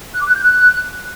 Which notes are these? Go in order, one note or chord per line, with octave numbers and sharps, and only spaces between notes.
F#6
D6
F#6
G6
F#6